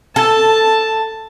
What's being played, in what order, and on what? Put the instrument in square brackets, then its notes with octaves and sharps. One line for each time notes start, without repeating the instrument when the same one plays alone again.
[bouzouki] A4 [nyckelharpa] A5